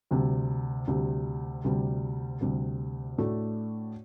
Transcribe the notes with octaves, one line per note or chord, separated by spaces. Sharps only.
D2 C3 G3
D2 C3 G3
D2 C3 G3
D2 C3 G3
A2 A3 D4 F#4